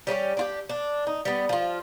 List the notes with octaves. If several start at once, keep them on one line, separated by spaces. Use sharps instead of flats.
G3 C#4 E4 G4
D4 F4 G4
D4
D#4
G3 B3
F3 F4